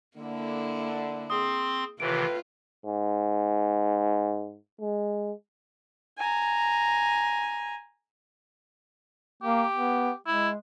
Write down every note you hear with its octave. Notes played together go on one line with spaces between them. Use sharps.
D3 A#3 E4
C4 G#4 C6 D#6
A2 C3 D#3 E3 F4 B4 D7
G#2
G#3
G#5 A#5
A#3 G4
B3
G#3 E4